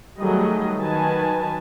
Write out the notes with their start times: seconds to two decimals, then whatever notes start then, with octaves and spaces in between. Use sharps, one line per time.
0.20 D#3 F#3 G3 A3 G#4 D#5
0.79 D#3 F#3 B4 G#5 A5